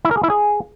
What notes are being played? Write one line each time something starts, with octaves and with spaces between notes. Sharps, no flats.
E4
A#4
G#4
E4
G#4